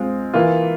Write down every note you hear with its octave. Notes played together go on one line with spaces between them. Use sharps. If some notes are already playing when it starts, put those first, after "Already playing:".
Already playing: G#3 C4 F4
E3 A#3 F4